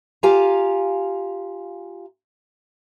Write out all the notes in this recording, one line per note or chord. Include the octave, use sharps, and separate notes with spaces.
F4 G4 F5 G#5 A#5